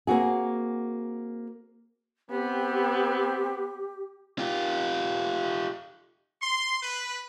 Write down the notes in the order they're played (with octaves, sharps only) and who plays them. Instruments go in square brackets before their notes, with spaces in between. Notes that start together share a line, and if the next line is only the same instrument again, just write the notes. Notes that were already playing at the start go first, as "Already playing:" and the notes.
[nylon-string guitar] A#3 C4 F#4 G#4
[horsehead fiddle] B3 [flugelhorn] C4 [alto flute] G4
[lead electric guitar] F4 G4
[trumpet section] C6
B4